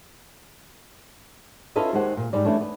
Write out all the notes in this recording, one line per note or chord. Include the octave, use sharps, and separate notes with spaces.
C#4 E4 F4 A4 B4 D#5
D#2 G#3 G4 G#4 C5 F#5
A#2
G#2 G3 D5
E3 G3 A3 C#4 D4
B3